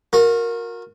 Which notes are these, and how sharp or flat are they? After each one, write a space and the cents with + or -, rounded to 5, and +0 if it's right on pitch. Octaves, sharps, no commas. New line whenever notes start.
F#4 -40 A#4 +0